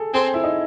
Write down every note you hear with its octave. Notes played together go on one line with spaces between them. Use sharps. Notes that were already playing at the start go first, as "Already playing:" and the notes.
Already playing: G#4 A4
C4 G#4
E4
D#4